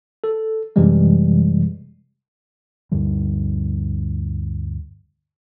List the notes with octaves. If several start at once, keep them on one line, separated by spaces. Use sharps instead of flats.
A4
F#2 C3 E3 G3 G#3
D2 G2 D3 G3